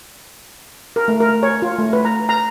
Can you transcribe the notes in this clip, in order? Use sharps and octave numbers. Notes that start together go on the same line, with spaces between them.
A#4
A3
A#4
C#5
F4
A3
B4
A#5
A#5